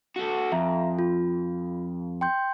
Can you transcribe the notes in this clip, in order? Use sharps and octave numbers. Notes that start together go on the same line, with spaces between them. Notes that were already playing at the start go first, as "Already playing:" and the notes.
F#4 A4
F2 E5 A#5
F4
G5 C6 G6